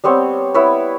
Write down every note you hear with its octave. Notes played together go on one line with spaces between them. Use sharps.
G3 B3 C4 C#5
B3 E4 B4 C#5